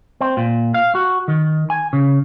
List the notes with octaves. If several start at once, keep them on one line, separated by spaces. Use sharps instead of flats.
C4
A#2
F5
F#4
D#3
G#5
C#3